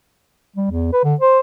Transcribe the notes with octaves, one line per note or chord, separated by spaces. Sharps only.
G3
E2
B4
D3
C5